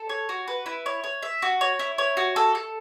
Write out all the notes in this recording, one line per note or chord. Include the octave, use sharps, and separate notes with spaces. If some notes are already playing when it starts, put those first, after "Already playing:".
Already playing: A4
C#5
F#4
B4
E4
C#5
C#5
E5
F#4
C#5
E4
C#5
F#4
A4
A4